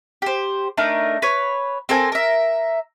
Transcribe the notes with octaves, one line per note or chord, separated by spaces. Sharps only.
G4 C5
A3 D4 D#4 A#4
B4 C#5
C4 A4 A#4 G#5
A#4 E5